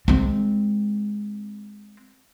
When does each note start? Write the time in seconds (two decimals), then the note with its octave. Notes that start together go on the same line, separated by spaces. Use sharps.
0.08 G#3 C4